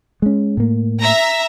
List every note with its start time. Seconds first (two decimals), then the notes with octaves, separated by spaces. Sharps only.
0.22 G#3 C#4
0.57 A2 A#3
1.00 E5 A#5